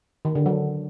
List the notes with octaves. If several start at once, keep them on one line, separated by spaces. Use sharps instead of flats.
D#3
D3
F#3